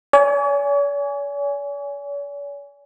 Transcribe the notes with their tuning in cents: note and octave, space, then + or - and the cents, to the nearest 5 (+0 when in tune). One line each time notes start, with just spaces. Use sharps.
C#5 +45 G#5 +0